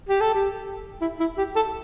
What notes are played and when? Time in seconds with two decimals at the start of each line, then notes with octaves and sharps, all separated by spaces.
0.09 G4
0.21 A4
0.34 G4
1.01 E4
1.20 E4
1.38 G4
1.56 A4